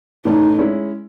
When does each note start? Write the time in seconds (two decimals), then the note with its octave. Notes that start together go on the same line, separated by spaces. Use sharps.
0.25 A2 E3 A3 C#4 D#4
0.58 G#3 C#4 E4